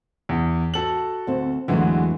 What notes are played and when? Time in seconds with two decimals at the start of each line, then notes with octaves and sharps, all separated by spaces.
0.29 E2
0.74 F#4 A4 F#7
1.27 D2 C4
1.68 E2 D3 E3 F#3 G#3 A3